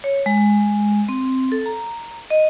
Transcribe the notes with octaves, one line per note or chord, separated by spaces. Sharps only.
C#5
G#3
C4
A4
A#5
D#5